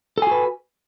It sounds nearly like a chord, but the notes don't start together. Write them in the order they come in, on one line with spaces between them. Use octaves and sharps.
A4 G#5 F#4 B4